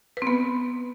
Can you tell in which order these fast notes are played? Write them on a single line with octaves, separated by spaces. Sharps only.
B4 C4 B3